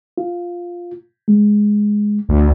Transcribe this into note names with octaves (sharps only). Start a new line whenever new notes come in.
F4
G#3
D2